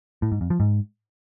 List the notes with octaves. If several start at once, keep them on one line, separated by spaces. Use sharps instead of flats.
A2
G#2
F2
F3
G#2